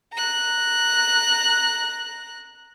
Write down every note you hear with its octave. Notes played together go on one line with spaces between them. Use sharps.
A#5 F#6